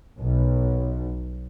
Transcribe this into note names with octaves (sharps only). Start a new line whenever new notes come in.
B1